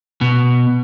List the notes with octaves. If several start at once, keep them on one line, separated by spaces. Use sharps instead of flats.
B2